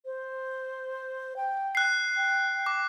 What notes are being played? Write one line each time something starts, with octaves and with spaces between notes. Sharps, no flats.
C5
G5
F#6 C7
G5
D6